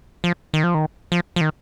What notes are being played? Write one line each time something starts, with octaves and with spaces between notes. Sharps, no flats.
F3
D#3
F3
D#3
F3
F3
D#3